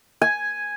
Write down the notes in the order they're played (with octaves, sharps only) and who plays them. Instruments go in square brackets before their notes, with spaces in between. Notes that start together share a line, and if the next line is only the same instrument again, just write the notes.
[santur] G#5